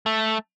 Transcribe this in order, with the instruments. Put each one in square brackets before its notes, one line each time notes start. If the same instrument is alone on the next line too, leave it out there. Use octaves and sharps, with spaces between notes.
[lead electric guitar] A3